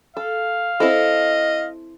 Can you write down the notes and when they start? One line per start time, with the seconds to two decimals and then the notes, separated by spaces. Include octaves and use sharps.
0.17 A4 F5
0.80 C4 E4 A4 D#5